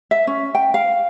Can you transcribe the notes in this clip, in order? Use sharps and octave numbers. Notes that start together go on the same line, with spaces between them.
E5
C#4
G5
F5